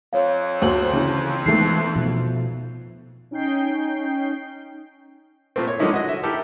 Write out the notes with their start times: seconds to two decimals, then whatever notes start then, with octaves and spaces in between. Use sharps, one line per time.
0.13 F2 C#5 F5
0.62 D2 C5 F#7
0.93 C#3 E3
1.46 D#3 E3 G#3 A3 B3 C7
1.96 B2 F3
3.31 C#4 D#4 G5 G6 C7
5.56 A#2 A3 A#3 C4
5.68 C#5
5.79 D3 F3 G#3 C#4 D#4 E4
5.93 F#4 D#5
6.09 E5
6.23 E4 G4 A4 A#4